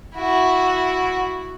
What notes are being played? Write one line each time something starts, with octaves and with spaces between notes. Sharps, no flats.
E4 F#4